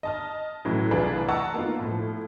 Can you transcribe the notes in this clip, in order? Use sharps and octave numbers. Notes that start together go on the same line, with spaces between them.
D#5 A5 F6
A2 C#3 E3 F#3
C2 E3 D4 F4 G#4 B4
D#5 F#5 A5 A#5 C#6 E6
A#3 B3 D#4 F4
A2 F3